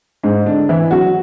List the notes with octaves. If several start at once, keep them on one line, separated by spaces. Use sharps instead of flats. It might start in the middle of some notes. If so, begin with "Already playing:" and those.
G#2 G#3
D3 D4
E3 E4
F#3 F#4